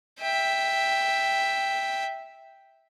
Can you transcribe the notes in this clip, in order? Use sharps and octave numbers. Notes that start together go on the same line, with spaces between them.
E5 G5